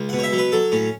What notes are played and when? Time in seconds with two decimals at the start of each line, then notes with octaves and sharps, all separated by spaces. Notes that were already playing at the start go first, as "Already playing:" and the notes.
Already playing: C#2
0.09 B2 F#5
0.19 C#5
0.23 E5
0.32 F#3
0.38 B4
0.52 F#3 A4
0.72 A2 C#4